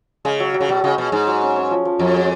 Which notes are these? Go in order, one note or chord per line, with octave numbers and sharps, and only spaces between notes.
C#3 G#3
F#3
F#3
C#3
B2 F#3
C#3 G#3
B2
G#2 G#3
F#3
C#4
C#4
F3
F3
F2 F#3
G#3